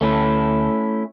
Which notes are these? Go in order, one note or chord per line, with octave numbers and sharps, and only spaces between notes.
D2 A3 C#4 E4